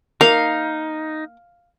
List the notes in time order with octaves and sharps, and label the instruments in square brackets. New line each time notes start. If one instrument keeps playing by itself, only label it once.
[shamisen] A#3 [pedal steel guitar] D#4 [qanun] F5